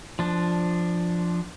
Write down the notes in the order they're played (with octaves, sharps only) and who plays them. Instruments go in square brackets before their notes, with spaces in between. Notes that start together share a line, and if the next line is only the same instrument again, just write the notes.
[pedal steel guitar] F3 D4